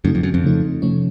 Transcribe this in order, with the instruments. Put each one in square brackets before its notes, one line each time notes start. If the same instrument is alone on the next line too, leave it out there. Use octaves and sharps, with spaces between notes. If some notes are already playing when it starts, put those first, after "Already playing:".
[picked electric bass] F#2 [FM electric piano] C#3 A3 D#4
[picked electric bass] F2
F#2
F2
[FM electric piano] C#3 A3 D#4
C3 F3 A3 C#4